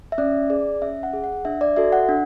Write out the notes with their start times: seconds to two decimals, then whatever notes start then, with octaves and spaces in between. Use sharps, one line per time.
0.12 E5
0.18 C#4 D5
0.50 G#4 D5
0.82 C#4 E5
1.03 F#5
1.13 G#4
1.24 F#5
1.45 D4 E5
1.61 D5
1.76 F#4 A4 E5
1.92 F#5
2.09 D4